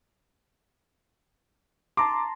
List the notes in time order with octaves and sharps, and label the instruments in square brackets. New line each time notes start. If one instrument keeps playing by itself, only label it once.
[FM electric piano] A5 A#5 C6 [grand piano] D6